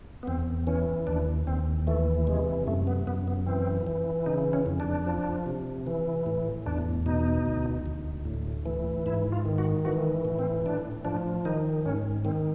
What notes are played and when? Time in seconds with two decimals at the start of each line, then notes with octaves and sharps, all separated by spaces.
0.23 B3
0.27 E2 C4
0.67 E3 C#4
1.07 D#2 D4
1.47 D#2 C4
1.87 E3 A3
2.27 C3 G#3
2.67 F#2 A3
2.87 B3
3.07 F#2 B3
3.27 B3
3.46 E3 C4
3.87 E3
4.26 C#3 D#4
4.53 C#4
4.66 F2
4.80 D4
5.06 F3
5.46 C3
5.87 E3
6.26 A2
6.66 E2 D4
7.06 B2 D#4
7.46 D2
7.86 D2
8.25 A2
8.66 E3
9.06 G#2 E4
9.32 F4
9.45 D#3
9.58 F#4
9.85 E3 F#4
10.25 A2
10.39 C4
10.66 A2 D4
11.05 F3 D4
11.45 D#3 D#4
11.85 G#2 C#4
12.25 D#3 C4